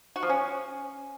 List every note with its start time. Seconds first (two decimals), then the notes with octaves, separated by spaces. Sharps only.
0.16 F#4
0.23 F3
0.29 C#4